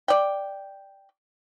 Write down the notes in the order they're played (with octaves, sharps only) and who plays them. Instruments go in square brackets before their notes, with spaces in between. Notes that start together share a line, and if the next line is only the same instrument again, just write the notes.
[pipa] D5 G5